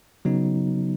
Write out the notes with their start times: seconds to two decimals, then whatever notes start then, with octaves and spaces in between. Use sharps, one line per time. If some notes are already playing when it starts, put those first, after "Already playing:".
0.25 C#3 F#3 B3 D#4